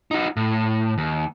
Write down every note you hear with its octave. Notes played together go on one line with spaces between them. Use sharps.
D#4 F#4
A2
D#2